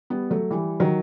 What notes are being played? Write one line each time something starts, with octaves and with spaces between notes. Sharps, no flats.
G3 B3
F#3 A3
E3 G3
D#3 F#3